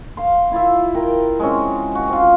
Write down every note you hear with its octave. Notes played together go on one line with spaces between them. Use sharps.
F5 C6
E4 F4 E5
A#4 G5
G#3 C4 C#4
F#4
C4 F4